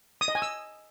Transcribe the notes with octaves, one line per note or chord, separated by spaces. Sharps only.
D#6
D#5
G#5
E6